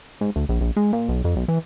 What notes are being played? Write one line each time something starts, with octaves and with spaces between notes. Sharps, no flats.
G#2
D2
A#1
A#1
G#3
A#2
B1
F2
B1
E3